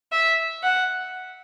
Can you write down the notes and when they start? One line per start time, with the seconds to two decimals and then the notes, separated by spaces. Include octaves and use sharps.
0.12 E5
0.63 F#5